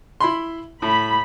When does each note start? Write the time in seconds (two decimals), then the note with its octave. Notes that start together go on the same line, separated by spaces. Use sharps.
0.20 E4 B5 C6
0.82 A2 B5